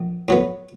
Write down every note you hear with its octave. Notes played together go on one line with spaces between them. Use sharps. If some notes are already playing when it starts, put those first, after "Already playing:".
Already playing: A#1
A2 F#3 B3